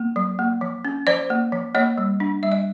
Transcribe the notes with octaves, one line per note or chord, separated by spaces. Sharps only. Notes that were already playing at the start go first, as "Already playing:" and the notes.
Already playing: A#3
F#3
A#3
F3
C#4
F3 C5 D5
A#3
F3
A#3 C#5 D#5
G3
D4
G3 E5
D#5